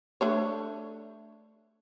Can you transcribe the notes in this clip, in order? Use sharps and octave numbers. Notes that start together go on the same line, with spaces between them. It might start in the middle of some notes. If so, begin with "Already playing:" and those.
A3 D4 C#5